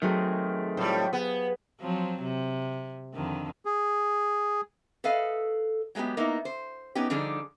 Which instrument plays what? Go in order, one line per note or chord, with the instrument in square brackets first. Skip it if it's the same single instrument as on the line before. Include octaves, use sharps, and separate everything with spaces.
[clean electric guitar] D#3 A3 C4 [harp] F#3 F#4 G#4
[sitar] A2 G3 [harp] F4 C5
[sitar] B3 [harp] G#4
[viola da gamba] F3 F#3 C4
C3
F2 D3 D#3
[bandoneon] G#4
[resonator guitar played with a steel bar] A4 B4 D#5 F5
F#3 G#3 A3 B3 G4
A#3 B3 D#4 E4
C5
B3 C#4 D#4 G4
D3 F3 G3 D4 D#4 G#4